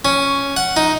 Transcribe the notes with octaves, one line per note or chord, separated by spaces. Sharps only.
C#4
F#5
D#4